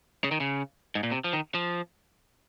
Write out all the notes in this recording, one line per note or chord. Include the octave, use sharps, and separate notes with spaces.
C#3
D#3
C#3
G#2
A#2
C3
F3
D#3
F3